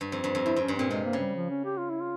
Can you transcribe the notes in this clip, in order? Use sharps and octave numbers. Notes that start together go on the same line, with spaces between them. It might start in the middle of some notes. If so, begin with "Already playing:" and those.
G2
F2
G2
F2
G2 E4
F2 C#4
G2
A#2 C4
C3 G#3
A#3
C#3
G3
F3
C#4
G4
F4
E4
F4